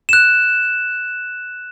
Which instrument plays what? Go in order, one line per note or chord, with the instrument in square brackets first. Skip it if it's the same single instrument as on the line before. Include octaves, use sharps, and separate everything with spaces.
[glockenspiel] F#6 E7